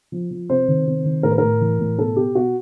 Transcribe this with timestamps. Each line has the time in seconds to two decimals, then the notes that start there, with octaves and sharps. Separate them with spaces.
0.12 F3
0.31 F3
0.49 C3 C5
0.68 D#3
0.87 C3
1.05 D#3
1.23 A2 A#4
1.31 B4
1.38 A2 A#4
1.61 E3
1.79 A2
1.99 B2 A4
2.16 B2 G4
2.35 B2 F#4